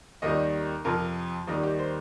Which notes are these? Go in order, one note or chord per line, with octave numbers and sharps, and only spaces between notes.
D#2 D#3 G3 D#5
F2 C3 F3 A#4
D#2 D#3 G3 D#4
G4
C5